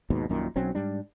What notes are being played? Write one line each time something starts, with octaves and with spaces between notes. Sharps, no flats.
D#2 G#2 B2
A#1 F#2 A#2 D#3
B1 F#3 C4 C#4
G#2 G3 D4